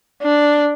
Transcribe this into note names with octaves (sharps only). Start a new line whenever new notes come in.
D4